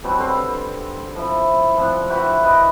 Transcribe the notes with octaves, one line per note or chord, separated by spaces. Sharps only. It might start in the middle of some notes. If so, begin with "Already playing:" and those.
B2 F#3 G3 C4
D3 C4
F3 E4
F3 C4 D4
E4 F#4 G4 B4
B4 D#5 D6